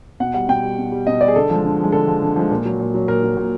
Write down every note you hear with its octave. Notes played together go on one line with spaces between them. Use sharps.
B2 F#5
G3 F#5
B2 G5
G3
B2
G3
B2 D#5
G3 D5
G#4
D3 A4
F3 G#3
D3
F3 G#3
D3 A4
F3 G#3
D3
F3 G#3
A#2
F#3
A#2
F#3
A#2 A#4
F#3
A#2